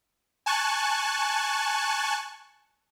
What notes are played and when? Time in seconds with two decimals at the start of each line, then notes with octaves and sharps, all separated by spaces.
0.46 G#5 A5 C#6 F#6